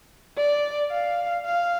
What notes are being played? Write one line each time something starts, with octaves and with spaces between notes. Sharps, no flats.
D5
F5
F5